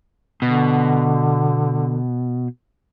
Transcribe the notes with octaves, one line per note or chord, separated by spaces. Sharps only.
B2 D3